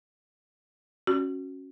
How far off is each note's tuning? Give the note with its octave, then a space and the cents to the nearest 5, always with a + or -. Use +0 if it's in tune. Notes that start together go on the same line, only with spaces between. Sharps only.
C#4 -15 F#4 +0